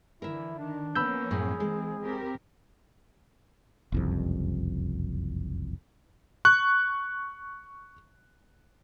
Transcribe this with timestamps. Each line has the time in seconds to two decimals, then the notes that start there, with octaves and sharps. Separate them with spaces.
0.22 D3 E3 E4 A#4 E5
0.58 D#3 D4
0.95 F3 A#3 B3 C#4 B5 E6 G6
1.31 F#2 A2 G#4
1.60 E3 G#3 C4
2.02 C4 G4 A#4
3.92 F#1 C2 F2
6.45 C#6 F#6